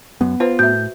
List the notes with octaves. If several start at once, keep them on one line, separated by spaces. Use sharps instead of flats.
F#2 B3
F4 B4 C5
A2 F#4 E5 G6